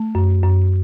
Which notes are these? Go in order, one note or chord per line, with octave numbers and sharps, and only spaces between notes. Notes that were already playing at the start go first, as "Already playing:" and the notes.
Already playing: A3
F#2
F#2